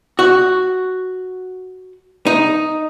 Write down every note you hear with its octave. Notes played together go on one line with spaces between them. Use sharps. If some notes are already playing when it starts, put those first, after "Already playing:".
F#4
D#4